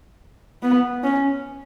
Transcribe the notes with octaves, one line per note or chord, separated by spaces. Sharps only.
B3
C#4